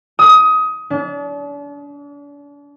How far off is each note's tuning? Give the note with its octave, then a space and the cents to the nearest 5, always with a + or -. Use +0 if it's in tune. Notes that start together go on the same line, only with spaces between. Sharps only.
D#6 +20
D4 -40